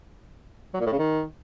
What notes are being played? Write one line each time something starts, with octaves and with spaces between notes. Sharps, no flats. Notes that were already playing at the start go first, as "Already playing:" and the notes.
F#3
A#2
A2
C#3
D#3